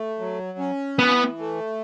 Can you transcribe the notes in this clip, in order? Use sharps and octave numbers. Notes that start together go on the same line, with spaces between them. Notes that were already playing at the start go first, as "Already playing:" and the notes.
Already playing: A3
F#3
C#4
E3 B3
A3